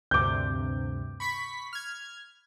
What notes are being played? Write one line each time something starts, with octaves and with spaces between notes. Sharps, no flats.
D2 G2 C3 D6 G6
B5 C#6 B6
F6 G#6